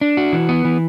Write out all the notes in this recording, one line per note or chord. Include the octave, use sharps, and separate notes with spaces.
D4
F#4
E3
B3
E3